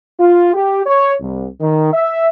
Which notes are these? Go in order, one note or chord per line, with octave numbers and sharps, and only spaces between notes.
F4
G4
C#5
C2
D#3
E5